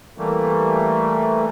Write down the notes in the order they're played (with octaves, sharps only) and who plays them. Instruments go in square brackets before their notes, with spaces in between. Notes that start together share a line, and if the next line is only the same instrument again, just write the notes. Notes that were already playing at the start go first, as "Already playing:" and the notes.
[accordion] E3 G3 A3 A#3